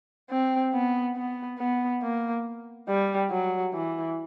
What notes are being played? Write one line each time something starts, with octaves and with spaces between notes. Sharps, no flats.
C4
B3
B3
B3
A#3
G3
F#3
E3